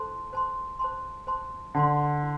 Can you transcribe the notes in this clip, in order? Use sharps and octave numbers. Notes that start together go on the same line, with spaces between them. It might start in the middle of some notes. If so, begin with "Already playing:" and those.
Already playing: E4 A4 C5 A5 C6
C5 A5 C6
C5 A5 C6
C5 A5 C6
D3 C5 A5 C6
E4